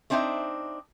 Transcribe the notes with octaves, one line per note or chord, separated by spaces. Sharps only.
A3 C4 D4 D#4 C5 E5